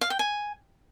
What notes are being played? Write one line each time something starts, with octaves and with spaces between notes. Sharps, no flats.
F5
G5
G#5